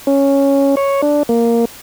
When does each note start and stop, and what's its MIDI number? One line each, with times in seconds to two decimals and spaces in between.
0.07 0.75 61
0.77 1.01 73
1.02 1.23 62
1.29 1.65 58